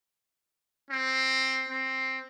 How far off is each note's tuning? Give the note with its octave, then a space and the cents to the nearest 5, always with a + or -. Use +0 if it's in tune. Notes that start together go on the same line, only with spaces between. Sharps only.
C4 +10
C4 +10